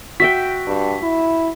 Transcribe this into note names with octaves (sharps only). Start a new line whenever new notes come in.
F#4 E5 G5 B6
G2
E4